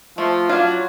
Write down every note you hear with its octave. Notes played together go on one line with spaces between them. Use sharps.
F3 A3
F#3 D4 F4